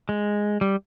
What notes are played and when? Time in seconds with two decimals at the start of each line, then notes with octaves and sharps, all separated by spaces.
0.09 G#3
0.61 G3